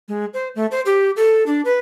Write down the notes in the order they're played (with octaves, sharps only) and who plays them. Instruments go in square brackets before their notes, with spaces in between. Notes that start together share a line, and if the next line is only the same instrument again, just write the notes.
[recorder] G#3
C5
A3
C5
G4
A4
D4
B4